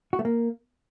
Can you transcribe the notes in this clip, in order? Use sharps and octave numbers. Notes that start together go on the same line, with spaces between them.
F#4
A3
A#3